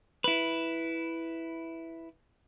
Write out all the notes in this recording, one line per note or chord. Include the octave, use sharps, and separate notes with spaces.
E4 B4